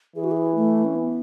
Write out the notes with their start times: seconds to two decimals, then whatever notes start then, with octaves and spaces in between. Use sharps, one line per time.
0.16 E3 G#4
0.24 F#4
0.31 G#4
0.55 A3
0.85 C#4
0.95 B3